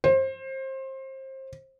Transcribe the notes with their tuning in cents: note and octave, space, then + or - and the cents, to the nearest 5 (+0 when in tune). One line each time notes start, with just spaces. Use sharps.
C5 +25